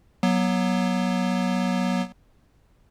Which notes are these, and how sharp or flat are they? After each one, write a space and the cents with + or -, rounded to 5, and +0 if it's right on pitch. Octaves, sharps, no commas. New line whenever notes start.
F#3 +5 B3 -35